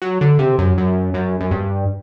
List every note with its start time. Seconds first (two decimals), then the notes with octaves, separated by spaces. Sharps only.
0.02 F#3
0.21 D3
0.39 C3
0.59 F#2
0.78 F#2
1.14 F#2
1.40 F#2
1.51 G2